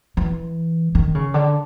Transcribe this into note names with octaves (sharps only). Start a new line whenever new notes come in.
E3
D#3
C#3
D3